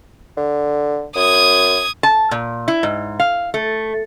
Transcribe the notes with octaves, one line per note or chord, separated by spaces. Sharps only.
D3
F#2 D#6 G#6
A5
A#2
E4
G#2
F5
A3